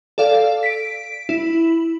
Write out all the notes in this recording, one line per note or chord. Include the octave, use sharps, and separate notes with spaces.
A4 D5 F5
B6 D7
E4